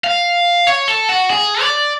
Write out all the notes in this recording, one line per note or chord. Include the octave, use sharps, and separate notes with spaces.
F5
C#5
A4
F#4
G#4
D5